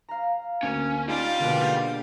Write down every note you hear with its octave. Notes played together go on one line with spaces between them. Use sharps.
F5 A#5
D2 A#3 C#4 D#7
G3 D#4 F4 D5
B2 D3 G#3 A#3 B4